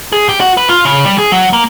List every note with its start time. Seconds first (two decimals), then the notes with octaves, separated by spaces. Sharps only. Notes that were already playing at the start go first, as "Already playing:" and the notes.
0.12 G#4
0.29 G4
0.40 F#4
0.57 B4
0.69 F4
0.85 C#3
1.05 G3
1.18 G#4
1.32 F#3
1.53 A#3